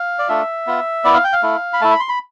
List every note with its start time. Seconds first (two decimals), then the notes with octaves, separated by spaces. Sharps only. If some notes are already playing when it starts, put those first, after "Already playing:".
Already playing: F5
0.19 D5
0.28 A3 D4 F4 E5
0.67 B3 F4
1.04 B3 E4 D5
1.14 F5
1.24 G5
1.33 F5
1.43 A3 E4
1.73 B5
1.81 A3 E4 A5
1.91 B5
2.00 C6
2.09 B5